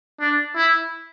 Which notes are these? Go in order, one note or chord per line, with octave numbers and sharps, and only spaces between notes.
D4
E4